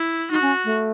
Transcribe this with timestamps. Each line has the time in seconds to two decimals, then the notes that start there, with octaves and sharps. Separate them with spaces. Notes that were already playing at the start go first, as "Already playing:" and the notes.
Already playing: E4
0.30 D#4 F#4
0.42 C#4
0.65 A3